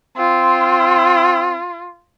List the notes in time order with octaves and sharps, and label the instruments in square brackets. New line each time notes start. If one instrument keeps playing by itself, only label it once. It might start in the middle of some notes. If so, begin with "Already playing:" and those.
[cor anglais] C4 [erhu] F4